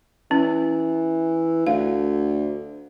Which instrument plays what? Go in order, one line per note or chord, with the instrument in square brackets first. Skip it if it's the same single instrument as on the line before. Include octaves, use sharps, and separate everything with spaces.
[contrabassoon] E3 [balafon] C#4
[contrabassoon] D2 [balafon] F5